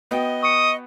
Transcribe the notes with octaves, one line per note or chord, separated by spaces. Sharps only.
B3 F#4 D#5 G5
C#6 D#6 C#7